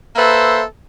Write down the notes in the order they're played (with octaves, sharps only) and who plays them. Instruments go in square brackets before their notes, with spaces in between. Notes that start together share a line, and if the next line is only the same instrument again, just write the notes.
[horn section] A#3 A4 B4 C5 E5